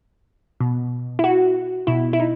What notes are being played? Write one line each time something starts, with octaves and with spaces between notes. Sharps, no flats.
B2
E4
F#4
B2 E4
E4
D#4